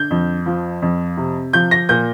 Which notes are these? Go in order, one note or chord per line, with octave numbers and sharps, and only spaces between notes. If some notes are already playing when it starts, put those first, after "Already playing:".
Already playing: D3 G6
F2
F3
F2
C3
F3 G6
A#6
A#2 G6